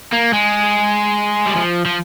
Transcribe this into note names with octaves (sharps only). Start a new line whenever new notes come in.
A#3
G#3
G3
F3
F3